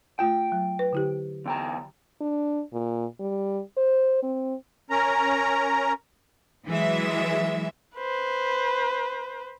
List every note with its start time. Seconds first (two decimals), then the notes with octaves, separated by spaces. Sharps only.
0.19 A3 F4 G5 G6
0.52 F#3
0.79 B4
0.93 D3 E4 G4
1.46 E2 G5 A#5
2.21 D4
2.73 A#2
3.20 G3
3.77 C5
4.23 C4
4.90 C#4 A#4 A#5
6.68 E3 F#3 G#3 E5
7.97 B4 C5